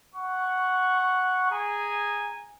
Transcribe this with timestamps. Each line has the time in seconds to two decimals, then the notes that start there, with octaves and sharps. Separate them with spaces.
0.15 F#5 C#6
1.50 G#4 G#5 A#5